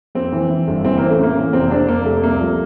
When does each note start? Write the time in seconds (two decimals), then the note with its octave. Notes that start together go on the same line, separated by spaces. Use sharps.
0.15 F2 C4
0.33 E3
0.50 E3
0.67 G1
0.85 E3 C4
0.98 A1 A#3
1.10 A3
1.19 A1 A#3
1.36 E3
1.53 F1 C4
1.71 F1 D4
1.88 F1 A#3
2.05 F1 A3
2.23 C2 A#3
2.40 F3